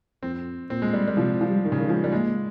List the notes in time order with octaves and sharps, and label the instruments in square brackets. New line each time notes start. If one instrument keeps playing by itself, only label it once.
[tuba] F2 [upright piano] C4
[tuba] A#2 [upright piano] C4
[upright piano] G#3
G3
G3
[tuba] C3 [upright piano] F3
[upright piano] F3
[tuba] G3
[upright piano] D#3
C#3
[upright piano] D#3 [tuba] G#3
[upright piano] F3
G3
[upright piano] G#3 [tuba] A#3